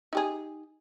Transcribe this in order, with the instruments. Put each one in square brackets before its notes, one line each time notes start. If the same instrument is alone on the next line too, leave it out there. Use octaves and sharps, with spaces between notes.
[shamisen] D#4 G4 G#4